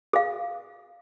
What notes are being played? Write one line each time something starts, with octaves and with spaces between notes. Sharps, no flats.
G#4 F5